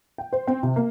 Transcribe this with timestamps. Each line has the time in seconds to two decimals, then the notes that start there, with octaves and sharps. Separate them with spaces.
0.18 G5
0.33 C5
0.47 C4
0.63 C3
0.76 A#3